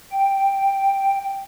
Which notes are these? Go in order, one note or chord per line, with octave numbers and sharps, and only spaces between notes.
G5